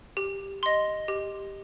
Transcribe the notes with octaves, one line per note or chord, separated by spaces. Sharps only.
G4
D#5 C6
G4